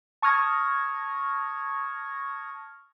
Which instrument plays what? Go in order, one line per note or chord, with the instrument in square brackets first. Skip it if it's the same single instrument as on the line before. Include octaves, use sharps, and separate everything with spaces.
[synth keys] A5 C#6 D#6 F6 G#6 A#6